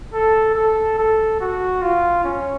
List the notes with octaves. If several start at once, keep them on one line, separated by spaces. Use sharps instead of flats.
A4
A4
A4
F#4
F4
C#4